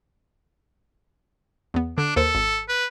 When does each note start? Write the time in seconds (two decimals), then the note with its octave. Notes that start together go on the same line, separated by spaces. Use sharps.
1.74 E2 B3
1.98 D3 D4
2.16 D#2 A4 A#4 C5
2.35 G#1
2.69 B4